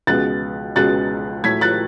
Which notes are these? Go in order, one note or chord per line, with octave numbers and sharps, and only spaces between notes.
C#2 B2 G#3 B3 F#6 A6
C#2 B2 G#3 B3 F#6 A6
A2 F#3 A3 G#6 B6
F#6 A6